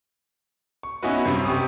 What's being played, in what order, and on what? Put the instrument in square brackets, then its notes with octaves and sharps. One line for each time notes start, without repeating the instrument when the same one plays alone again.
[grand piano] C#6
B3 C#4 D#4 E4 F#4 B4
G2 C3
C3 G4 C#6 D#6